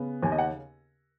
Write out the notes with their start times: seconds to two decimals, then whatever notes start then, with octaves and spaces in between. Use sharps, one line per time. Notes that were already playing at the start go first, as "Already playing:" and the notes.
Already playing: C#3 B3
0.23 D#2 G#5
0.32 D#5
0.38 F#5